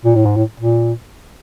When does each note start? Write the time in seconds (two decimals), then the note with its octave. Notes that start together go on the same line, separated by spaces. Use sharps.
0.05 A#2
0.15 A2
0.26 G#2
0.36 A2
0.60 A#2